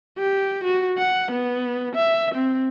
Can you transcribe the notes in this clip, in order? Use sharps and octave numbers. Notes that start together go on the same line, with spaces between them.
G4
F#4
F#5
B3
E5
C4